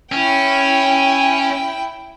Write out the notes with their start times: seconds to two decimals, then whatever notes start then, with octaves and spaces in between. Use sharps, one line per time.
0.12 C#4 E4 G5